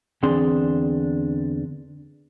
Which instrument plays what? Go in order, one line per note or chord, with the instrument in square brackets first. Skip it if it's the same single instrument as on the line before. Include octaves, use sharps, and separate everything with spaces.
[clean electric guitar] E2 D3 C4 D4 G#4 C6